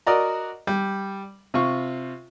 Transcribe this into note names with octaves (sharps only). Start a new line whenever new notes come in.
F#4 A#4 D5 D#5 A#5
G3
C3 F4 C#6